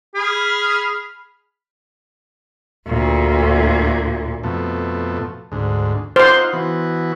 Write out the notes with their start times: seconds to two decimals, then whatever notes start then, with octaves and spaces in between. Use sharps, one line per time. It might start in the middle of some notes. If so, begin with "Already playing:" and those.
0.14 G#4 B5 F6
2.87 D2 A#2
4.44 F2 B2 A3
5.52 D2 G#2
6.16 D#4 F4 C5 F#5 C6
6.53 E3 B3 F#4